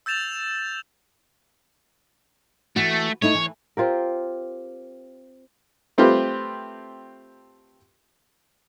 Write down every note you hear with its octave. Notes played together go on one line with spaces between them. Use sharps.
E6 G6 A6 E7 F7
E3 A3 F#4
A3 D#4 E4 C#5
E3
C4 F4 G4 A#4
A3 C4 F4 G4 B4